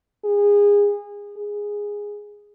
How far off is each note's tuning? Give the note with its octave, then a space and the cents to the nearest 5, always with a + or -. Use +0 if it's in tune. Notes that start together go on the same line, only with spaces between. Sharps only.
G#4 -25
G#4 -10